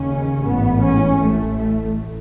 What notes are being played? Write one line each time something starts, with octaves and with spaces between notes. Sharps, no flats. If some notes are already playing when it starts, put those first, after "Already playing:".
Already playing: D#2 C#3 C#4
A1 G#2 B3
C#4
A1 A2 A3